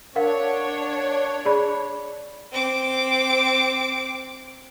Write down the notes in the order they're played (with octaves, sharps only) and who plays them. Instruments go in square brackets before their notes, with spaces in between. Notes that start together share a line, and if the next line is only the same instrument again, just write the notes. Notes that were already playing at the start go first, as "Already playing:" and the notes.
[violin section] D4 C#5 [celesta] A#4 F5 F#5
[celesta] G#4 D5 B5
[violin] C4 D6